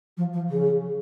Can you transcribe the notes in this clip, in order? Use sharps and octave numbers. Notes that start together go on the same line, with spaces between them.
F3
F3
C#3